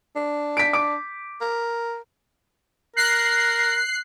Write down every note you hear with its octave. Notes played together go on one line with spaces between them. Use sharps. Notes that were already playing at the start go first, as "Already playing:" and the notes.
D4
B6 D7
D6 D7
A#4
A#4 F#6 C7